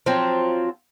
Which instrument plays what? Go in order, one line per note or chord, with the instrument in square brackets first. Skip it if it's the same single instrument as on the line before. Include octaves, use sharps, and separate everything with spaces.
[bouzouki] F3 F#3 C4